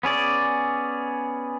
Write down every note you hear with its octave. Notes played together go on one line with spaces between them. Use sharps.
B3 C#4 G#4 D5